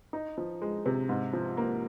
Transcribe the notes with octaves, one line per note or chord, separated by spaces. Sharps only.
D#4
F3
G#3
C3
G#2
F3
A#3